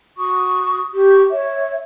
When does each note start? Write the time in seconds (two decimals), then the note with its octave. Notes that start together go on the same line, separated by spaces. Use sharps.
0.17 F#4 C#6 D#6
0.93 G4 C#6
1.31 C#5 E5